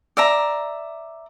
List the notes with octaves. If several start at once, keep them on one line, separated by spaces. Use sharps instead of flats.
D5 E5 A#5